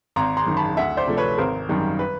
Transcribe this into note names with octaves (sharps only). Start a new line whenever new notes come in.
G#1 A#5 C6
A#5 C6
F#2 D#3
A5 B5
D2 E5 F#5
C5 D5
C3 F3 A3
B4 C#5
G#1 A#4 C5
F#2 D#3 G3
B4